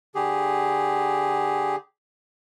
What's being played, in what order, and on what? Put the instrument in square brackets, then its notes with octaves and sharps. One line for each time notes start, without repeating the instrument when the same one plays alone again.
[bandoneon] D3 G4 G#4